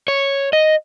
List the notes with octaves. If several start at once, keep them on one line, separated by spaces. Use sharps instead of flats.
C#5
D#5